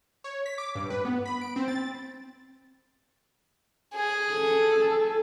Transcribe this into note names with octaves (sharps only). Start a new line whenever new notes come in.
C#5
B6
D6
G2
B4
B3
B5
D7
C4
A6
G#4
A4